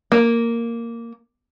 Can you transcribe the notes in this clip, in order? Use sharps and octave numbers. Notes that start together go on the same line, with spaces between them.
A#3